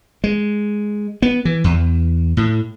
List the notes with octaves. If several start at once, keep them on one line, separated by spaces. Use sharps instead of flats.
G#3
B3
E3
E2
A2